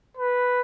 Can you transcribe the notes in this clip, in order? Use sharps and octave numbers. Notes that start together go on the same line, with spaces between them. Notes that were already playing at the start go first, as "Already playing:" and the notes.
B4